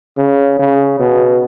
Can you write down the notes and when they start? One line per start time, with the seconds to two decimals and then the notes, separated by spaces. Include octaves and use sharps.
0.17 C#3
0.59 C#3
1.00 B2